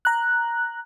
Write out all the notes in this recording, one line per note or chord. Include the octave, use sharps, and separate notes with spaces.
A#5 F#6